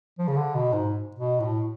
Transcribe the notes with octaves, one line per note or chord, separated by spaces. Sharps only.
F3
C#3
D3
B2
G#2
B2
A2